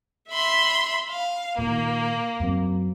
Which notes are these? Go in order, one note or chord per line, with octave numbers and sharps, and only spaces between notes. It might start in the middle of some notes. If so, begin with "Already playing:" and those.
E5 B5 C6
F5
A#2 D#3 A#3
F#2 F#3 C4